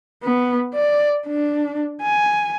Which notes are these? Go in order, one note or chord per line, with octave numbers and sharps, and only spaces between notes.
B3
D5
D4
G#5